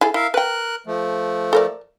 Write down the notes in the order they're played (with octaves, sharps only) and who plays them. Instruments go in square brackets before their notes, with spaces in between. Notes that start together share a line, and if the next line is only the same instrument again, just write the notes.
[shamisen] E4 G#4 A4
[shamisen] E4 [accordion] A#4 E5 F5
[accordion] A#4 F#6 [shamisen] B4 G5
[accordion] F3 A3
[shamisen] A4 A#4 D5